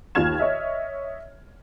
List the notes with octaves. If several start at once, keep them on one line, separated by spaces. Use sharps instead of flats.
D#2 F4 F6 G#6 E7
C#5 D#5 E5